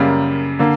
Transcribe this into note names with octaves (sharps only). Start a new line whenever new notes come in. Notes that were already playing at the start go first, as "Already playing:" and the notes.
Already playing: F#2 C#3 G3 A#3
D3 A#3